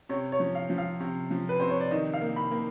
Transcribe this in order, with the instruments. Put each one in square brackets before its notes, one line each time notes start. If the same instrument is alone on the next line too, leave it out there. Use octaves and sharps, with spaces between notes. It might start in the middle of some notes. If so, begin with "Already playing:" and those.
[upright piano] C3 C#5
C#5
F3
F5
F3
F5
C3
F3
B4
C3 C5
C#5
D5
D#3 D#5
F5
A#3
B5
A#3